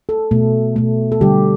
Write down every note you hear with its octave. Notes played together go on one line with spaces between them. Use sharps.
A4
B2 A3
B2 A3
A4
D3 G3 G4